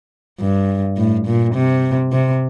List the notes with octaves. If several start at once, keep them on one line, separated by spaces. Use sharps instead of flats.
G2
A2
A#2
C3
C3